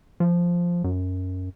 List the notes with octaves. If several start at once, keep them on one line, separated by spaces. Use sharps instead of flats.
F3
F#2